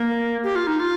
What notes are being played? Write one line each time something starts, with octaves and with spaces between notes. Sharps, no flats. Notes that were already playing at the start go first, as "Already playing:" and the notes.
Already playing: A#3
G4
F4
D#4
F4